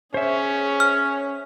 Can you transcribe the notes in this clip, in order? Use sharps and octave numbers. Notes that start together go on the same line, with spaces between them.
C#4 G#4 C5 C#5 E5
F6